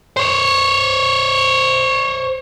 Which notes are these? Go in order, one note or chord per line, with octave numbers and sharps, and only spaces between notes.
C5 C#5